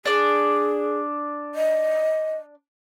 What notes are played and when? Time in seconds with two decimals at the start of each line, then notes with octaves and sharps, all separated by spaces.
0.06 D4 G#4 D5
1.55 D#5